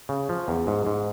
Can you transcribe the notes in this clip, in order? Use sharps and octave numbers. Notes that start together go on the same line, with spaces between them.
C#3
F3
E2
G#2
G#2